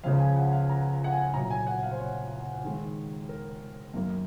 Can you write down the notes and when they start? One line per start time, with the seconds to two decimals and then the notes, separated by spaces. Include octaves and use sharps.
0.04 C#2 C#3 F3 F5
0.20 G#5
0.36 F#5
0.53 F5
0.69 A#5
1.04 F#5
1.12 G#5
1.34 C2 A#2 F#3 A#5
1.50 G#5
1.67 F#5
1.83 F5
1.91 C5
1.99 C#5
2.64 D#2 D#3 G#3
3.29 A#4
3.94 F#2 D#3 A#3